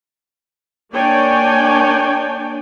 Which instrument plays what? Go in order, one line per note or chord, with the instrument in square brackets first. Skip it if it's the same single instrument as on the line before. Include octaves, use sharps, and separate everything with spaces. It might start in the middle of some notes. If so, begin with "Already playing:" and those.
[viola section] A#3 D4 C#5 D5 G5 G#5